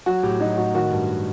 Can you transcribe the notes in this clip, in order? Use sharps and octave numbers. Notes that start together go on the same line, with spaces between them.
F#3 F#4
A2 G4
F#3 D#4
A2 F#4
D#3 F#4
G2